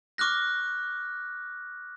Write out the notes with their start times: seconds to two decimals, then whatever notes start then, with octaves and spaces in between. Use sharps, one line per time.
0.18 C#6 D6 F6 F#6 A#6